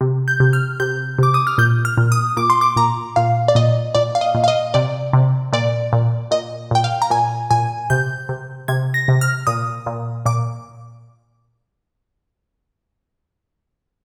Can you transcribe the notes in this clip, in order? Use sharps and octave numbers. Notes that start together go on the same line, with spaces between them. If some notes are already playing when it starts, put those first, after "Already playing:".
C3
G6
C3
F6
C3 G6
C3 D6
D#6
F6
A#2 G6
F6
A#2
D#6
A#2 D6
C6
D6
A#2 A#5
A#2 F5
D5
A#2 D#5
A#2 D5
F5
D#5
A#2
F5
D#5
C3 D5
C3
A#2 D5
A#2
A#2 D#5
A#2 G5
F5
A#5
A#2 G#5
A#2 G#5
C3 G6
C3
C3 G#6
A#6
C3
F6
A#2 D#6
A#2
A#2 D6